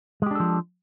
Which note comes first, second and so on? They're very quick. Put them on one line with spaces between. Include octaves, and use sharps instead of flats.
G#3 G4 D4 A4 F3